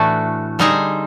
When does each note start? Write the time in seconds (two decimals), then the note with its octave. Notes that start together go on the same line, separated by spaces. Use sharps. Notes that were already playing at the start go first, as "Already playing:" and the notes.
Already playing: A2 E3 A3 D4 F#4
0.59 D3 G3 C4 D#4 G#4